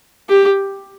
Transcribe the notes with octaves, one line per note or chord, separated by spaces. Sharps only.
G4